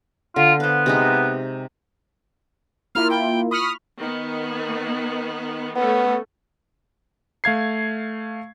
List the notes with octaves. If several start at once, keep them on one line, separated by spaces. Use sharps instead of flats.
D3 F4
B3 C5 F5
C3 G#3 D#4
A#3 E4 F4 F6
G5
B5 C#6 D#6 F6
D#3 B3
A3 B3 C#4 A4
A3 F5 G#6 C7